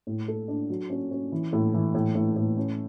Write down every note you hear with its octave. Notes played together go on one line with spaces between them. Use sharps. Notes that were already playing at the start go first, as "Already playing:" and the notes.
A2
A4
D4
F#3
C#4
C#4
E3
A2
E3
A2
A2
A2
C#4